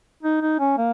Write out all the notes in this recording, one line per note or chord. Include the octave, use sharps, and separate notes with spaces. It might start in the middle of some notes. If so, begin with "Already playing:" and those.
D#4
D#4
C#4
A#3